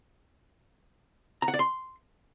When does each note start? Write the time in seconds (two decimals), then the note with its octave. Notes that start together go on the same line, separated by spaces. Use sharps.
1.42 A#5
1.48 F#5
1.54 D5
1.59 C6